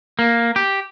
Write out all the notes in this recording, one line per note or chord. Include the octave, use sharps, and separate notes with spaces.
A#3
G4